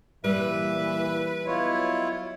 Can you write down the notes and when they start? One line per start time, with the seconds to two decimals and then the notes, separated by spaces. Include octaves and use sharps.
0.24 A#2 E3 G3 B4 E5
1.46 F#3 B3 E4 F4 C#5 D#5